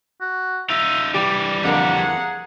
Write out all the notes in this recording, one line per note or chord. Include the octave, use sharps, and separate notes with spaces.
F#4
D#4 F4 E5
E3 G3 G4 D5
F2 D3 A#3 F#5 A#5
G#4